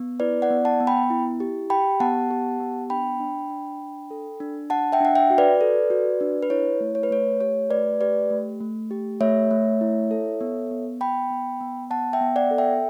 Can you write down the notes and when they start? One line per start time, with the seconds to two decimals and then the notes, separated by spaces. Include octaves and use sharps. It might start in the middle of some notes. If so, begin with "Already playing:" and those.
Already playing: B3
0.20 E4 B4 D5
0.42 D5 F#5
0.50 B3
0.65 F#5 A5
0.80 B3
0.87 G5 B5
1.10 E4
1.40 G4
1.70 G4 G5 B5
2.00 B3 F#5 A5
2.31 G4
2.60 B3
2.90 D4 G5 B5
3.20 D4
3.50 D4
3.80 D4
4.11 A4
4.40 D4
4.70 D4 F#5 A5
4.93 E5 G5
5.00 D4 F#5
5.15 E5 G5
5.30 F#4
5.38 B4 D5
5.61 A4
5.90 F#4
6.21 D4
6.43 B4
6.50 E4 C#5
6.80 A3
6.95 C#5
7.03 B4
7.11 A3 C#5
7.41 G4 C#5
7.70 A3 B4 D5
8.00 G4 B4 D5
8.30 A3
8.61 A3
8.91 G4
9.20 A3 C#5 E5
9.51 A3
9.81 E4
10.11 A4
10.41 B3
10.71 B3
11.01 B3 G5 B5
11.31 B3
11.61 B3
11.91 B3 F#5 A5
12.13 E5 G5
12.21 B3
12.36 D5 F#5
12.51 A4
12.58 E5 G5